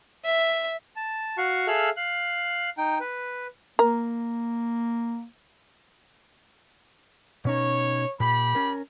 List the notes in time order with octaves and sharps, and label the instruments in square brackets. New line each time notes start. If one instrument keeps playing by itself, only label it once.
[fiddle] E5
[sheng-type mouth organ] A5
F#4 F5 F#5 C#6
G#4 A4 E5 F5 F6 F#6
F5 F#6
D#4 G5
B4
[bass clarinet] A#3 [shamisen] A#4
[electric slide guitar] B2 C#4 D#4 [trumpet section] C#5
[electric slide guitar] A#2 [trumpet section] G4 B5
[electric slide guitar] C#4 A#4